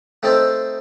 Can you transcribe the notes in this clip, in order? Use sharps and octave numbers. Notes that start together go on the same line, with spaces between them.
A3 C4 D#4 A4 C5